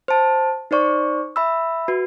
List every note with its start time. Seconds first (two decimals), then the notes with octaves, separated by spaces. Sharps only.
0.08 C5 A5
0.71 D#4 C5 D5 C#6
1.36 E5 B5 E6
1.88 F#4 B4